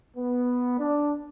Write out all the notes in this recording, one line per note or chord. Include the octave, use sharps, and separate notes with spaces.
B3
D4